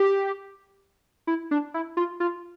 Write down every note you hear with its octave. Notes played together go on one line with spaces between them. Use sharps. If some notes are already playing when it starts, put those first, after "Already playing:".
Already playing: G4
E4
D4
E4
F4
F4